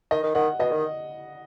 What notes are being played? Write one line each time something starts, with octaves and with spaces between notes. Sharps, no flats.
D#3 D#5
D#3
D#3 F#5
B2 D#5
D#3